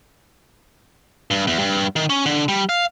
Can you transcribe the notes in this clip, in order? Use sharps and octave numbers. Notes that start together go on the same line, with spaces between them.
G2
E2
G2
D#3
C#4
D3
G3
F5